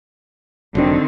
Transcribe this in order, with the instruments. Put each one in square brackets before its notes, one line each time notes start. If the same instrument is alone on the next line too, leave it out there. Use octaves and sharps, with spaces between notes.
[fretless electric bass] F1 F#3 D4 [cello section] D3 D#3 C4